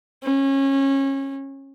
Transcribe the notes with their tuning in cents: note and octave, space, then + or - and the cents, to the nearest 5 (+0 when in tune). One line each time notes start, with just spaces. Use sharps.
C#4 -25